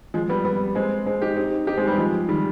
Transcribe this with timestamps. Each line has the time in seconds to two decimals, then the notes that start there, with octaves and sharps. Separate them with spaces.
0.14 F3 G#3
0.29 G3 B3
0.45 G3 B3
0.75 G#3 C4
1.06 G#3 C4
1.21 D#4 G4
1.37 C4 D#4
1.67 D#4 G4
1.77 G#3 C4
1.87 G3 B3
1.98 F3 G#3
2.28 D#3 G3